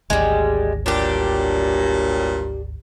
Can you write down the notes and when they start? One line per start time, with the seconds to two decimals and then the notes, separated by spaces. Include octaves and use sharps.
0.10 G#1 D2 G3 G#3
0.86 G2 A#2 F#3 D4 G4